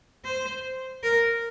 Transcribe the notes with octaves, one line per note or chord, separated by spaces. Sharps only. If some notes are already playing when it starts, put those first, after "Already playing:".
C5
A#4